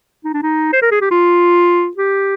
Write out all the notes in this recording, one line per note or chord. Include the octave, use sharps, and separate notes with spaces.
D#4
D4
D#4
C5
A#4
G#4
G4
F4
G4